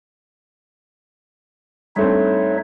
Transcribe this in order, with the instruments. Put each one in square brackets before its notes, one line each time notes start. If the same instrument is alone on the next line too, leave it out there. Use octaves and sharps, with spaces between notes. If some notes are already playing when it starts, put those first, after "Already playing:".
[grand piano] G2 A3 C4 [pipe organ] D#4 C#5 E5